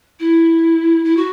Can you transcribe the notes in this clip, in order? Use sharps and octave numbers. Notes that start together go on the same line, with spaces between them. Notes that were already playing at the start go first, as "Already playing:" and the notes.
E4
E4
F#4